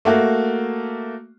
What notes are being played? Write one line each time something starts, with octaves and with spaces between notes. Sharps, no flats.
A3 A#3 F#4